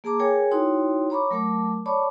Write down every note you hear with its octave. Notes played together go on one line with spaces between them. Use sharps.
A#3 G#4 A5 A#5 D6
G#4 A#4 C#5 G5 G#5
D#4 E4 F#4 C#5 G5 C6
C#5 A#5 B5 C#6 D6
F#3 A3 A#4 A5 D6
C#5 D5 A5 B5 C#6 D6